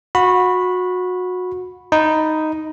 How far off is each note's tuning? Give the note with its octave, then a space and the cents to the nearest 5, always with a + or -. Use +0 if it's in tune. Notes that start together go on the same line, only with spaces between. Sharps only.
F#4 -25 B5 +0
D#4 +0 B5 +0